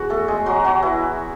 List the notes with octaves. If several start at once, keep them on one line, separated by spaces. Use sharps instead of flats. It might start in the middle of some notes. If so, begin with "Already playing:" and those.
Already playing: E2 F#4
A3 A4
G#3 G#4
F#3 F#4
F#3 F#4
E3 E4